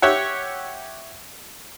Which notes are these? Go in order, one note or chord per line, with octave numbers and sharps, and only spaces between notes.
G4 C#5 E5 F#5